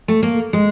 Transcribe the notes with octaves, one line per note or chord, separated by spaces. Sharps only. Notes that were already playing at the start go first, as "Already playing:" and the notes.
A3
A#3
G#3